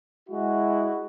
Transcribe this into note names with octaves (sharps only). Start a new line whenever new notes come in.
G#3 E4 F#4